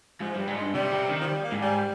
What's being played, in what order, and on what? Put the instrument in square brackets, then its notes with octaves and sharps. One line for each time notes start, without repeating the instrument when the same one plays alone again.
[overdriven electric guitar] G#2 [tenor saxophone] F3
[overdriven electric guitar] G2 [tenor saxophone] G3
[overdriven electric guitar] G#2
[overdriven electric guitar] G2 [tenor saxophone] G#3
[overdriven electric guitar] C3 [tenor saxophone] G3
[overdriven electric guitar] C3
D#3
[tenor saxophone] F3
G3
A#3
[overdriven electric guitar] G#2
[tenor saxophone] G3